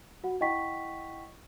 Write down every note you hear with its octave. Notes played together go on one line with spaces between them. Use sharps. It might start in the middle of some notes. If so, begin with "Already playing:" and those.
F#4 F#5
E4 D#5 F#5 G5 C#6 B6